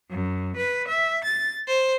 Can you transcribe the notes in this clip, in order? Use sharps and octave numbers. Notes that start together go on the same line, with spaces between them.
F#2
B4
E5
A6
C5